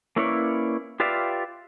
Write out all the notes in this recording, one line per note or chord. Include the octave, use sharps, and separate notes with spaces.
A#3 C#4 E4 B4 C#5 D5
F4 G4 B4 D5 E5 F5